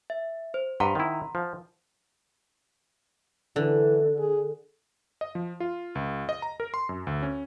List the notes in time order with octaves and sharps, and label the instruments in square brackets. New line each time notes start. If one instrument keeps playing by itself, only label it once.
[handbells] E5
C5
[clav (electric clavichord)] G2 [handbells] F#5 A#5 C6
[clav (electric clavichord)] D#3 E4
F3
[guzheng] D3 [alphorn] E3
[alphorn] G#4
[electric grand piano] D#5
F3
F4
C#2
D#5
A#5
A#4
C6
F#2
D2
C#4